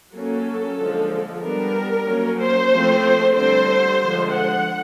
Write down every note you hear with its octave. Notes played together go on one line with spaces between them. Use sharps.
F#3 A#3 C#4 A4
D3 F3 G#3
G3 B3 D4 A#4
F#3 A#3 C#4
C5
F3 A3 C4
D3 G3 C4 C5
D3 F3 G#3
F#5